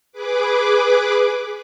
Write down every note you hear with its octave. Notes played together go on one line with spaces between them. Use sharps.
G#4 B4 D6